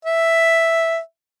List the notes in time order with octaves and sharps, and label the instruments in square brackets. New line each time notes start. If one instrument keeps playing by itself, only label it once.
[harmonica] E5